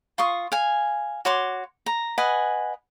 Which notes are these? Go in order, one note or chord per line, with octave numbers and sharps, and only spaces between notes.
F4 C6 C#6 D#6
F5 G#5
F#4 C#5 C6 D6
A#5
B4 D#5 F#5 G#5